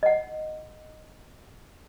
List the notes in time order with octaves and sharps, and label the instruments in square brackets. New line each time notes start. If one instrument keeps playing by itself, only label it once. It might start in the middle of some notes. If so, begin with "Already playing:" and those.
[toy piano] D#5 F#5